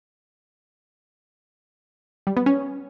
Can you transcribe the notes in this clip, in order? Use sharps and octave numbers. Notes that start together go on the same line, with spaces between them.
G3
B3
C#4